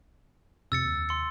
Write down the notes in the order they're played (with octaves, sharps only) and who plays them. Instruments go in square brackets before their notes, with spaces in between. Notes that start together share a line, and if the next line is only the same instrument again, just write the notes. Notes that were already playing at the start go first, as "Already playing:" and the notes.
[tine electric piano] F2 C3 [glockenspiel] E6 A6 C#7
[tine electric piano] D#2
[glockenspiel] C6 C#7